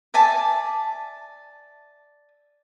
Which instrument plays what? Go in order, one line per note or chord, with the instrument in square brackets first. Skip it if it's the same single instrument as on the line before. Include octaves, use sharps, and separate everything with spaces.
[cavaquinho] D5 E5 G#5 A5